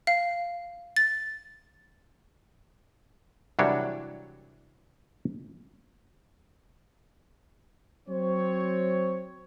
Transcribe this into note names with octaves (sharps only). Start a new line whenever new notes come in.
F5
A6
C2 E3 F#3 G3 D4 C#5
F#3 C4 C5 C#5